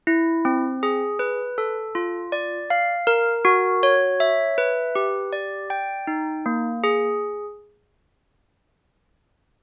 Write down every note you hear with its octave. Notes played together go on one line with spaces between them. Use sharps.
E4
C4
G#4
B4
A4
F4
D5
F5
A#4
F#4
C#5
E5
B4
G4
D5
G5
D#4
A#3
G#4